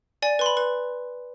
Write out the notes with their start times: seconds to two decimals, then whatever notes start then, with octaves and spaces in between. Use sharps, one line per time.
0.22 D5 G#5
0.39 B4 C6
0.46 B5
0.57 B4